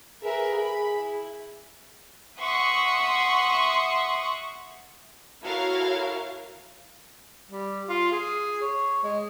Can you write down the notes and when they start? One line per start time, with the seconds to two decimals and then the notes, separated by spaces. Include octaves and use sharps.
0.24 G#4 A#4 B4 E5
0.56 G#4 B5
0.94 E4
2.38 E5 F#5 C6 C#6 D#6
5.44 E4 F#4 A4 A#4 C#5 F5
7.51 G3
7.89 F4
8.12 G#4
8.62 C#5
9.03 G#3